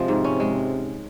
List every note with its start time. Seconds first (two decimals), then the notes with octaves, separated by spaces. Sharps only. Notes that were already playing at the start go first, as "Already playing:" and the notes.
Already playing: C3 F3 G#3
0.08 G#2
0.24 C#4
0.40 G#3